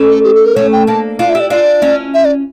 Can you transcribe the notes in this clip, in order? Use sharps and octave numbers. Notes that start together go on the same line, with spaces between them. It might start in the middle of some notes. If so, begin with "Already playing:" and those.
Already playing: A3 C#4
A4
G4
A4
A#4
A3 C#4 C#5
G5
A#3 D4 A5
D4 F4 F5
E5
E4 G4
D5
D4 F4 D5
C#4 E4
E5
D5